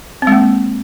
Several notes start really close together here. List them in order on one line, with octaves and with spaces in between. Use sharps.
C4 G#3 A#3